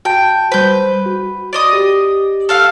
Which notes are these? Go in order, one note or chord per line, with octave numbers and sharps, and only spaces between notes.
F#4 G5 A5
G3 B4 C5 G6
F#4
D5 D#5 D#6
G4
A4 F5 F#5